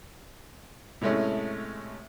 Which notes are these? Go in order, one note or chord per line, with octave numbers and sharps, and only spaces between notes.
A2 C3 G#3 A3 C#4